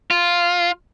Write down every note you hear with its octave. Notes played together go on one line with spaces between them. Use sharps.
F4